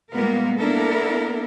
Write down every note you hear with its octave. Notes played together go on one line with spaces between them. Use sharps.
A#2 G3 G#3 A#3 B3 A#4
A#3 B3 D4 E4 A4 A#4